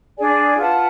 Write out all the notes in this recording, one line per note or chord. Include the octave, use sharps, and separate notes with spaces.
D4 G#4 D5 G#5
F4 B4 F#5 A5